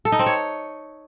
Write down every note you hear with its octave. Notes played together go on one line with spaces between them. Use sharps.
A4
D#4
C4
C#5